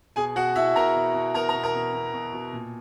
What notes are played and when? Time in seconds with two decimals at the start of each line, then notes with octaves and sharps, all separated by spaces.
0.16 B2 G#4 G#5
0.36 B2 F#4 F#5
0.55 B2 E4 E5
0.75 B2 A#4 A#5
0.96 B2
1.14 B2
1.34 B2 A#4 A#5
1.49 A#4 A#5
1.54 B2
1.63 A#4 A#5
1.74 B2
1.93 B2
2.14 B2
2.33 B2
2.53 A#2